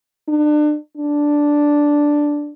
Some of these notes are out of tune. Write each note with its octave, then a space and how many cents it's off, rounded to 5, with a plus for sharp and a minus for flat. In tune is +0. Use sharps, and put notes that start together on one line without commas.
D4 +35
D4 +0